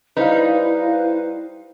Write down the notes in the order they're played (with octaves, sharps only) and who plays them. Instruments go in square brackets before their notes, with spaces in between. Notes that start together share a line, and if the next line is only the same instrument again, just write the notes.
[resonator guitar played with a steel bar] G3 D#4 [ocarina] E4 [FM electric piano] B4 C5 F5